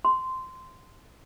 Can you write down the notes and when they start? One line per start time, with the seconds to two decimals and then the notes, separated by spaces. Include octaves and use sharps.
0.05 C6